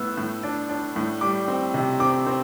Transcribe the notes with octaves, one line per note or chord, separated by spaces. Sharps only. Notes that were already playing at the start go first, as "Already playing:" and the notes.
Already playing: A2 B3 E6
A2
D4
D4
A2
G3 D6
C4
C3
C4 D6
C4